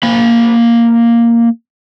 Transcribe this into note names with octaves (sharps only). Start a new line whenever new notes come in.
A#3 B5